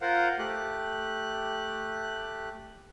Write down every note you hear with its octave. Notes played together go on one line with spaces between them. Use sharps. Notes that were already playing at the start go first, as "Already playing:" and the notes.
F4 A#4 C5 F5 F#5
A3 G4 F#6